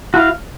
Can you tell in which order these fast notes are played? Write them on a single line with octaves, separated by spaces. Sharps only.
F#4 E4 F5